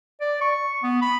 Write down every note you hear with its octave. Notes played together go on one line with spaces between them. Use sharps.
D5
C#6
B3
B5